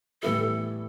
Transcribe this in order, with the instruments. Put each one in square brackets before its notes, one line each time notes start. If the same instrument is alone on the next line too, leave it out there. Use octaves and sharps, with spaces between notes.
[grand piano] A2 E3 G3 B3 E4 [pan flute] A4